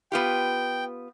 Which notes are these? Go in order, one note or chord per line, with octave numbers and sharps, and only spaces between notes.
B3 F4 G4 G5